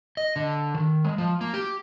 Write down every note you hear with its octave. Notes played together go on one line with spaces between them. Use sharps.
D#5
D3
D#3
G#3
F3
A#3
G4